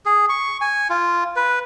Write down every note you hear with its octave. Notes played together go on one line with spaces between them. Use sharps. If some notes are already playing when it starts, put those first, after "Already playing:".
G#4
C#6
G#5
F4
B4